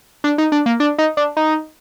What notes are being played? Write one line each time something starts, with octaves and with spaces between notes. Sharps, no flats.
D4
D#4
D4
A#3
D4
D#4
D4
D#4